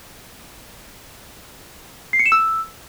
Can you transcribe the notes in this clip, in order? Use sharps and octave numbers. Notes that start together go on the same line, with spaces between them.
C7
C#7
E7
E6